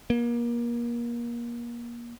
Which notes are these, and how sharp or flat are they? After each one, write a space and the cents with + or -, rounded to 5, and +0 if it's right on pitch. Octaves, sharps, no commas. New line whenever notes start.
A#3 +30